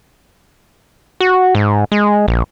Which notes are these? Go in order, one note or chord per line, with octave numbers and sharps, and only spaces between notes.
F#4
G#2
G#3
A#1